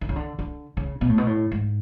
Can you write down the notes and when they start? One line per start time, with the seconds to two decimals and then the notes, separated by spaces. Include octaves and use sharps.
0.01 D3
0.09 C#3
0.16 D3
0.39 D3
0.77 C#3
1.01 B2
1.09 A2
1.18 B2
1.27 A2
1.52 G#2